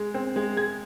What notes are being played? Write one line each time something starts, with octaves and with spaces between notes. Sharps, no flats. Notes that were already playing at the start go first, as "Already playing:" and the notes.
Already playing: G#3
C4
G#3
G#3 G#6